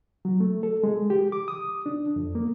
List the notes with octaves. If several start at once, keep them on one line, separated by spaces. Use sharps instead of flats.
F#3
A3
A4
G#3
G4
D6
D#6
D4
F2
A#3